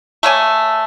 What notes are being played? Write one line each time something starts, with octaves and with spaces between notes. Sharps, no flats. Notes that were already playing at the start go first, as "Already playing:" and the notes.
A3 A#3 C#5 G#5